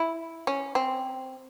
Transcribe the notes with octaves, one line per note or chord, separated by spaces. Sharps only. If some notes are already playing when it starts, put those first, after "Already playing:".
Already playing: E4
C#4
C4